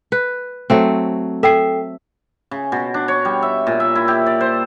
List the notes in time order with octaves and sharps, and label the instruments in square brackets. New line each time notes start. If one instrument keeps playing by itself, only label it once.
[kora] B4
F#3 A3 C4
[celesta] A4 G5 C7 [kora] E5
[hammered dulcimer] C#3
B2
D4
C#5
G3
E5
A#2
E5
E4
G4
D5
C5